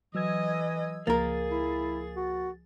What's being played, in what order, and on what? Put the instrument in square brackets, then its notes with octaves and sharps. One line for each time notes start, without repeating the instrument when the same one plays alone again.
[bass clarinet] E3 [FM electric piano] F#3 E6 G#6 [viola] D#5
[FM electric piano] C#2 F3 A6 [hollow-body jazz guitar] A#3 A#4 [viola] G#4
[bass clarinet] E4
F#4